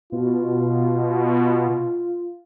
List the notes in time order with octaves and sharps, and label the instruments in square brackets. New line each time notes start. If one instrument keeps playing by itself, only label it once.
[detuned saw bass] B2 [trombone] F4